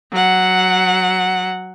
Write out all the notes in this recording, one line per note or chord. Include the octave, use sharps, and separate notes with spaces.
F#3 F#5